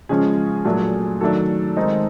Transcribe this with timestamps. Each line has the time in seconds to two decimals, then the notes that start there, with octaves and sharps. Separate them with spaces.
0.09 C#3 F3 G#3 C#4 G#4
0.65 A#2 F#3 A3 D4
1.21 D#3 F#3 A3 D4 A4
1.77 D#3 G#3 C4 D#4